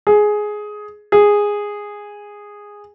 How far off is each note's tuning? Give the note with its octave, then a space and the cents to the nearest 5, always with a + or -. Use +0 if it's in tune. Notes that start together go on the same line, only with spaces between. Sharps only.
G#4 +10
G#4 -10